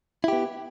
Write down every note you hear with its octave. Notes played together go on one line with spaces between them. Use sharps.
B3 E4 G4